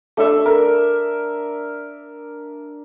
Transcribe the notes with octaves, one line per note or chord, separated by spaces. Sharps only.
A3 D4 A4 E5
A#4